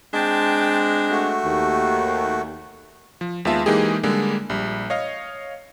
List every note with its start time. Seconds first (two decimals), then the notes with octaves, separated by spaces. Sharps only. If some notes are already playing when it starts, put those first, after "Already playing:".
0.14 G#3 C4 D4 G5 A5
1.10 A3 F#4
1.44 D#2
3.21 F3
3.45 D#2 G#3 B3 F4 E5 A5
3.66 E3 G#3 A#3 D#4 G4 G#4
4.03 D3 G3 G#3 A#3
4.50 A#1 G3
4.90 C#5 D#5 F5